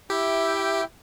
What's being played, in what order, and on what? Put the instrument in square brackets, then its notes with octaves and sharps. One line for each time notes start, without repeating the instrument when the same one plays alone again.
[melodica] E4 E5 G5 [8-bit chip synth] G4